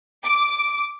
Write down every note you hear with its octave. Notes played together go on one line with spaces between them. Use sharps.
D6